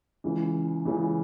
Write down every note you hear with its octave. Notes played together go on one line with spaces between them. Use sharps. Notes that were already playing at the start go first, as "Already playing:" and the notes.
C#2 C#3 E3
C#2 C#3 E3